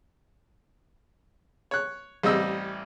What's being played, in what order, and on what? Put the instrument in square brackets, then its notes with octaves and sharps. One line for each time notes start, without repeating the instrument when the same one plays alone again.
[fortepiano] C#5 F#6
A1 G3 C4 D#5 E6